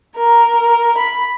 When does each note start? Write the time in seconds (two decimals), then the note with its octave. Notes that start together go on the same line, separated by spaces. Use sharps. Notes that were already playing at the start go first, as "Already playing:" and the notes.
0.17 A#4
0.98 B5